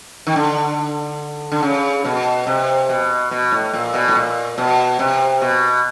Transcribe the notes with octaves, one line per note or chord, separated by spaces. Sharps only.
D#3
D3
D3
C#3
B2
C3
B2
B2
A2
A#2
B2
A2
A#2
B2
C3
B2